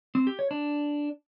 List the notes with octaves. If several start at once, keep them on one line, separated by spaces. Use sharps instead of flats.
C4
G4
C#5
D4